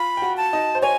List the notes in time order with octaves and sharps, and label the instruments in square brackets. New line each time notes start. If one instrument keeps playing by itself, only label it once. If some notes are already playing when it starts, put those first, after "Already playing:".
Already playing: [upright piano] F4 F5 [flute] B5
[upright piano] G5
F#4 F#5
[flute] A5
[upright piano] D#4 D#5
C5
[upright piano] C#5 [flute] G#5